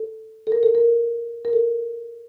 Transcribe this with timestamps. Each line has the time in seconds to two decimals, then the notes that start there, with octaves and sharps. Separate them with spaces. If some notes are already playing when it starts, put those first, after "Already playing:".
Already playing: A4
0.47 A4
0.52 A#4
0.63 A4
0.75 A#4
1.45 A#4
1.53 A4